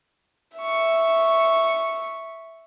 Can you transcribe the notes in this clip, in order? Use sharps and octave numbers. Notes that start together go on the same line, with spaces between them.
E5 C#6